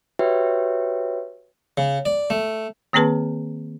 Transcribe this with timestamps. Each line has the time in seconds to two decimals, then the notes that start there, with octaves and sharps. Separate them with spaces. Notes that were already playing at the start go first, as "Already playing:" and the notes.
0.19 F#4 G4 B4 C#5 E5 G5
1.77 C#3
2.06 D5
2.30 A3
2.93 D#3 A#3 C4 G#4 B4 A5